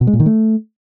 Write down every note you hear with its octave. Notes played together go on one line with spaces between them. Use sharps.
B2
G#3
A#2
D#3
A3